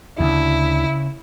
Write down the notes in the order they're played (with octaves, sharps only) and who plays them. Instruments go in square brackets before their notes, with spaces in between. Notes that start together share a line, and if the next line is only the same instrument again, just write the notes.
[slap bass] D2 [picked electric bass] C#3 [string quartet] E4